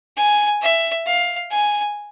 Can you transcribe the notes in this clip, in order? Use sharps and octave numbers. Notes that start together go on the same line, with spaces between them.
G#5
E5
F5
G#5